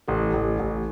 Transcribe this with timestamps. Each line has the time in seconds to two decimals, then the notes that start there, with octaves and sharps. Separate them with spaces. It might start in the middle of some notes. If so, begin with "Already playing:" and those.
0.08 A1 G4 A4
0.33 A1
0.59 A1